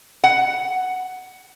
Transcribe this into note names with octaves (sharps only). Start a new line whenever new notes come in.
F#5